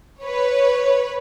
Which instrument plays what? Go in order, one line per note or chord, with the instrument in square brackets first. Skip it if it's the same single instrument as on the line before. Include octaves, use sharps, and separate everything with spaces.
[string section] B4 C#5